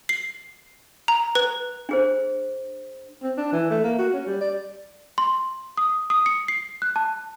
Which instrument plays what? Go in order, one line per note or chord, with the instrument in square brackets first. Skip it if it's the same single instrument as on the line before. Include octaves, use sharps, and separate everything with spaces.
[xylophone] C7
A#5
B4
[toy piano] D4 G#4 C5
[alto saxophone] C4
D4
E3
A3
A#3
F#4
C#4
G3
D5
[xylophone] C6
D#6
D#6
C#7
C7
F#6
A5